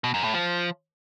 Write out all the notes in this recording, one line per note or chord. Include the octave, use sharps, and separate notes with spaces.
B2
F#2
A2
F3